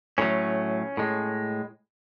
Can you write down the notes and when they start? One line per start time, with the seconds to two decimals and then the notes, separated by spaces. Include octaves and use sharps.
0.18 A2 F#3 A3 C#4
0.97 A2 G#3